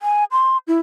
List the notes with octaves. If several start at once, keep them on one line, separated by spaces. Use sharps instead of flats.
G#5
C6
E4